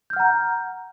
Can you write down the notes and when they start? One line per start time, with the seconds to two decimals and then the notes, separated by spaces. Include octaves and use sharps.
0.10 G6
0.13 F6
0.16 F#5
0.20 A#5